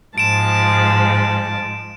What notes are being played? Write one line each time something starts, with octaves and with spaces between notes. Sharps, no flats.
G#2 F3 G#3 A5 D7 E7